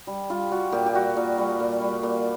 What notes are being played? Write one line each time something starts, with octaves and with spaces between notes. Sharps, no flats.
G3
G3 F4
G3 F#4
A#2 G4
G4
G3 F#4
A#2
G3
A#2
G3
A#2